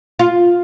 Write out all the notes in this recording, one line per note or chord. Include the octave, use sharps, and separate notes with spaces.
F4